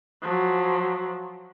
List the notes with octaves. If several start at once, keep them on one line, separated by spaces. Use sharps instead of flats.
F3 F#3